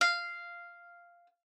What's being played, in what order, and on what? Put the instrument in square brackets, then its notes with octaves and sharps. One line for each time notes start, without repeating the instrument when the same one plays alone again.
[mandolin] F5